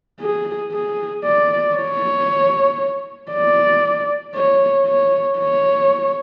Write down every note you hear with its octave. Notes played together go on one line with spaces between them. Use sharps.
G#4
G#4
D5
C#5
D5
C#5
C#5
C#5